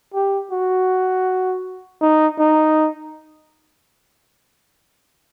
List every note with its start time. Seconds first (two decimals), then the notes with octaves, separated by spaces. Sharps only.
0.14 G4
0.51 F#4
2.01 D#4
2.39 D#4